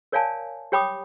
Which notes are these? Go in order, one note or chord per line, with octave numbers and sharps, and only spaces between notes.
A#4 C#5 D5 F5 G#5 A5
G4 C#5 G5 B5 D6 D#6